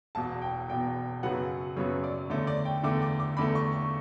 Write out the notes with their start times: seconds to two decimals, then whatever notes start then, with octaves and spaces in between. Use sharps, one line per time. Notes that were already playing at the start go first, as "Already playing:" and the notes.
0.15 E1 E2 B2 A5
0.42 G5
0.68 E1 E2 B2 G5
1.23 F#2 C#3 F#3 B3 F#5
1.76 F#2 C#3 F#3 B3 C#5
2.04 D5
2.29 E2 D3 A3 C#5
2.47 D5
2.65 G5
2.83 E2 D3 A3 D6
3.02 D6
3.20 D6
3.37 E2 D3 A3 B5
3.55 C#6
3.74 C#6